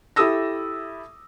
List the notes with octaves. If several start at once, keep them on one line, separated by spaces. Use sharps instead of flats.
E4 G4 A4 D#6 E6 A#6